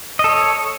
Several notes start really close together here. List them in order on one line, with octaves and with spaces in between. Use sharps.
D#5 A4 C#5